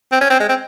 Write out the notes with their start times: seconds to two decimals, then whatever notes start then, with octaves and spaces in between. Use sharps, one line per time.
0.12 C4
0.21 C#4
0.30 C4
0.40 G#3
0.49 C4